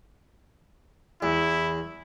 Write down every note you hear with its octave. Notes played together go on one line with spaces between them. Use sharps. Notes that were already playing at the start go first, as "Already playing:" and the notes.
E2 E4